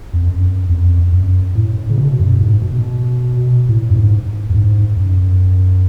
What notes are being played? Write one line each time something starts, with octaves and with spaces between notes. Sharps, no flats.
F2
F#2
F2
F#2
A2
C#3
B2
F#2
G#2
B2
A2
F#2
G#2
F#2
G#2
F#2